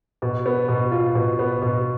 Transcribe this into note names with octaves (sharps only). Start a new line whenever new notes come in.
B2
B3
B2
F4
B2
B3
B2